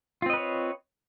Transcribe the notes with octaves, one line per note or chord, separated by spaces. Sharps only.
C4 F4 B4 C#5 D#5